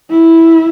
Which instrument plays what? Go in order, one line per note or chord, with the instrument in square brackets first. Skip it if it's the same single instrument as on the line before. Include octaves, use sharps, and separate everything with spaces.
[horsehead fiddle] E4